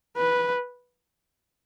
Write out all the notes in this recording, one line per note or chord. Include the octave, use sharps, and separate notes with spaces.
B4